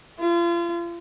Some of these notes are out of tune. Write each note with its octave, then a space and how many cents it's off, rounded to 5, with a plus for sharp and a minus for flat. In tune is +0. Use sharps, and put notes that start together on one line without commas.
F4 -35